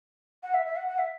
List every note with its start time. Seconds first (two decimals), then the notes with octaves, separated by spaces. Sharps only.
0.43 F#5
0.54 E5
0.66 E5
0.76 F#5
0.88 F#5
0.98 E5